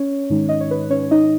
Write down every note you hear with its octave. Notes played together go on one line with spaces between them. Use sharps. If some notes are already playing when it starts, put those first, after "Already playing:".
Already playing: C#4 C#5
G#2 D#3 G#3 D#4
D#5
C#5
B4
C#4 C#5
D#4 D#5